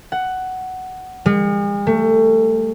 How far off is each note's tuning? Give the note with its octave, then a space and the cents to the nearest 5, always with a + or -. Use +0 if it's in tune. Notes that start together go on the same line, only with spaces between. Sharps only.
F#5 +10
G#3 -45
A3 +25